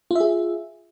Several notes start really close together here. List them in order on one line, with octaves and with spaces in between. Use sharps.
F4 E5 G#4